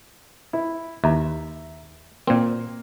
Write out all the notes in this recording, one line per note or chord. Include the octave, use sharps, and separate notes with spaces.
E4
D#2 E5 A#5
A#2 A#3 C4